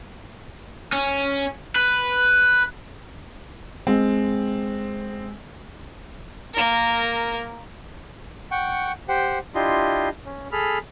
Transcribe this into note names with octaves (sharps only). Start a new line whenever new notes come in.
C#4
B4
G#3 C4
A#3 A#4
F#5 G5 C#6
G4 C5 F#5 G5
D4 E4 F4 G4 D#5 C6
C#4
G#4 A4 B5 F6